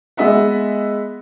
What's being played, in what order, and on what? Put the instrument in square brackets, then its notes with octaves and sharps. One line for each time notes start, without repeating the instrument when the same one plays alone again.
[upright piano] G#3 B3 D#5 E5 F#5